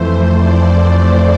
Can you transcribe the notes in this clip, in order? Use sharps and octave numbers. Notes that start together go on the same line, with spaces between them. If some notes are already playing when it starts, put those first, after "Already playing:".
Already playing: F2 E3 A3 C5
D5